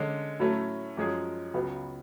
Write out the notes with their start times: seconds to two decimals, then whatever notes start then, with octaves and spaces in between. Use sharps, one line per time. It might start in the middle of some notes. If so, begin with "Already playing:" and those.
Already playing: D3 G#3 C#4
0.40 A2 F#3 A3 C#4
0.97 F#2 F3 G#3 C#4 G#4
1.54 C#2 C#3 F#3 B3